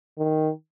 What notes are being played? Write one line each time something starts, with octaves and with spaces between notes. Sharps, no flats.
D#3